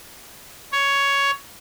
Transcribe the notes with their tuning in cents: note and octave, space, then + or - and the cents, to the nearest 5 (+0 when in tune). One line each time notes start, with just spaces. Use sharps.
C#5 +10